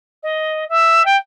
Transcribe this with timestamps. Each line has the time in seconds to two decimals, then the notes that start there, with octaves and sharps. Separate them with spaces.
0.23 D#5
0.69 E5
1.05 G5